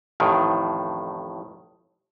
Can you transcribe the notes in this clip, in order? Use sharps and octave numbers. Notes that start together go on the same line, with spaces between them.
A1 F2 A2 D#3